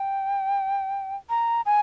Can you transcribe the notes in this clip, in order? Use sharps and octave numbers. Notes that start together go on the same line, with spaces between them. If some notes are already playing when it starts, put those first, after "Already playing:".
Already playing: G5
A#5
G#5